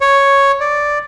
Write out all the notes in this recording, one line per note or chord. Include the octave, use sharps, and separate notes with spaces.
C#5
D5